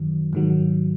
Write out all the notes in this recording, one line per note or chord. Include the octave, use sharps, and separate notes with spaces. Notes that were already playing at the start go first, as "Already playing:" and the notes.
Already playing: F#2 D#3 F#3
G#2 D#3 F#3